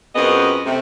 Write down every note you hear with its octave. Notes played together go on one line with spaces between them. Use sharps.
F#2 B3 C4 F4 G#4 D#5
C3 A3